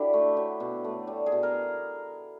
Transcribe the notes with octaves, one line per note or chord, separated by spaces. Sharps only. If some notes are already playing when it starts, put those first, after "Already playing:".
Already playing: D3 F#3 E4 G4
A3
F#3
B2
A3
G3
G#4
B2
A#4